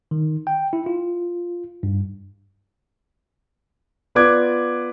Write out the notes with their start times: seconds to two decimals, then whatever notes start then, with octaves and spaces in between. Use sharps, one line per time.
0.11 D#3
0.47 G5
0.73 E4
0.86 F4
1.83 G2
4.15 B3 F4 B4 D5 D6 G#6